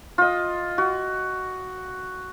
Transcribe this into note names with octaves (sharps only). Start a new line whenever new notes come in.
F4 D#5
F#4